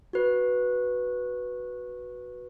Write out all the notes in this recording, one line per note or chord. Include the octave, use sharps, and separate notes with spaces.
F#4 B4